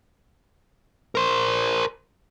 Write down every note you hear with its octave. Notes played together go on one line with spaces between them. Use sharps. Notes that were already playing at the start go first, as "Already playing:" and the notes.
A#4 C5